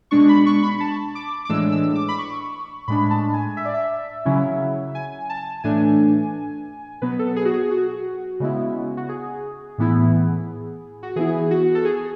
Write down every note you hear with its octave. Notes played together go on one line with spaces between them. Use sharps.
B2 G#3 D4 C#6
B5
C#6
B5
A5
D6
D6
A2 E3 G#3 D4 E6
E6
D6
B5
C#6
A2 G#3 D4 B5
A5
G#5
E5
D5
E5
C#3 F#3 C#4 E4
G#5
A5
A2 E3 A3 D4 G#5
B2 F#3 B3 B4
A4
G#4
F#4
G#4
F#4
C#3 G#3 B3 E4
F#4
G#4
A2 E3 B3 E4
F#4
E3 B3 E4 G#4
F#4
A4
G#4